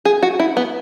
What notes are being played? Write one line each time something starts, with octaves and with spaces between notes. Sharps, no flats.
G#4
F#4
E4
B3